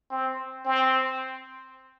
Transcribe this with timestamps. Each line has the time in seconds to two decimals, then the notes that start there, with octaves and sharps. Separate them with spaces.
0.10 C4
0.65 C4